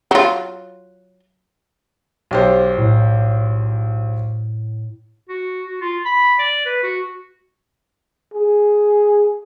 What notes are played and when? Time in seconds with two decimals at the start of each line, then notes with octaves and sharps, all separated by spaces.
0.11 F#3 F4
2.31 B1 G4 C5
2.78 A2
5.29 F#4
5.66 F#4
5.81 F4
6.05 B5
6.39 D5
6.65 B4
6.83 F#4
8.34 G#4